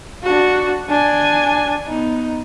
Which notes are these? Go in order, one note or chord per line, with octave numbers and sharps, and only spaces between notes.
D4 F#4
D4 G#5
B3 D#4